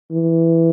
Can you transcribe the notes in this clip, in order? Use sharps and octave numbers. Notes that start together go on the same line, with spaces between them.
E3